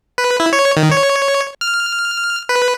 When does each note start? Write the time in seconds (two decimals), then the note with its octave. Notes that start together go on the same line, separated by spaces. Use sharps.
0.18 B4
0.40 E4
0.53 C#5
0.77 D#3
0.91 C#5
1.61 F6
2.49 B4